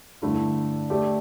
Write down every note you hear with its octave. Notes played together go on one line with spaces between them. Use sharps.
G2 D3 A3 E4
A3 G4 D5